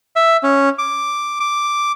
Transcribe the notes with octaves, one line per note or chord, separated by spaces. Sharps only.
E5
C#4
D6
D6